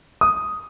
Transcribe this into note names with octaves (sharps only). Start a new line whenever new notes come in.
D#6